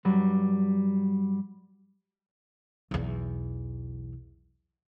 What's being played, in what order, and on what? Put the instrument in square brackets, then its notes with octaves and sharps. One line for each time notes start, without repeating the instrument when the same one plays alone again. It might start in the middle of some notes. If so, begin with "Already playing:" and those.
[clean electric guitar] G2 F#3 G3
[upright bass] B1 E2